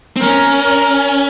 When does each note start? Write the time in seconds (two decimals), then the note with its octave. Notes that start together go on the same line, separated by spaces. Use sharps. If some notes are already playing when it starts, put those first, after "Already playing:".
0.16 C4
0.20 C#4 A#4
0.62 A#4